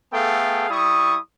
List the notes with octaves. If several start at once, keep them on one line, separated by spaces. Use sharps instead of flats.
A3 B3 G#4 A4 F5 G5
G3 E4 C#6 D#6